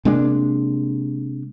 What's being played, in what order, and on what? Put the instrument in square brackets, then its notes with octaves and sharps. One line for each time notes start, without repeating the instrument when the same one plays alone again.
[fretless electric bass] C3 G#3 A#3 D4